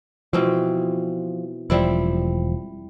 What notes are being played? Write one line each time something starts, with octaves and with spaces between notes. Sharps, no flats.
B2 E3 F3 C4
E1 F3 G3 C4 E4